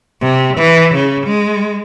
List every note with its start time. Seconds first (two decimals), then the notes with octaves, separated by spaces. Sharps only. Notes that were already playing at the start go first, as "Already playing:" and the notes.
0.21 C3
0.57 E3
0.94 C#3
1.26 G#3